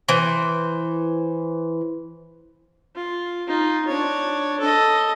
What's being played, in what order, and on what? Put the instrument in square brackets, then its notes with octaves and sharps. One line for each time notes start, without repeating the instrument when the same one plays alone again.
[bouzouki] E3 C5
[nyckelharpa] F4
D#4 F4
D4 C#5
A4 D#5